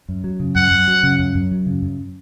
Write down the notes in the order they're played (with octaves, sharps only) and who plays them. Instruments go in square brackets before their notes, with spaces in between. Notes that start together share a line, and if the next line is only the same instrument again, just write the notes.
[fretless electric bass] F#2
F#3
C#3
[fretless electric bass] F#2 [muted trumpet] F#5
[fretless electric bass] F#2
F#3
C#3
F#2
F#2
F#3
C#3
F#2